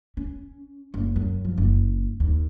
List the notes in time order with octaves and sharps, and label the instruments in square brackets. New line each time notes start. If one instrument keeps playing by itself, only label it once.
[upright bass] C#4
F#1
F#2
F3
F#1
D#2